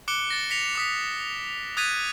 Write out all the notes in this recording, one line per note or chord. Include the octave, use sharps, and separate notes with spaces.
D6 F#6 C#7 D7 G7
A6 A#6
A#6 B6 C#7 F7
D6 D#6 B6
D#6 F#6 G#6 A6 B6 D#7